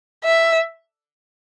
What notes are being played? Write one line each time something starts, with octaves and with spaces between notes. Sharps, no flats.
E5